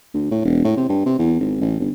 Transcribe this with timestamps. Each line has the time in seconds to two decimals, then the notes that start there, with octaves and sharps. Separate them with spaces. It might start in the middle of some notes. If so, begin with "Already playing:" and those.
0.14 D2
0.31 A2
0.45 E1
0.64 A2
0.77 C3
0.89 G2
1.06 C3
1.19 E2
1.41 G#1
1.61 A1
1.80 G1